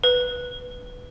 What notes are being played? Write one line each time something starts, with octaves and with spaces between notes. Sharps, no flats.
B4